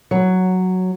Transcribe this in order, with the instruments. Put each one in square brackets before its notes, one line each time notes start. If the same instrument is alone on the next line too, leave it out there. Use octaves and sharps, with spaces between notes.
[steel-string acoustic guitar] F#3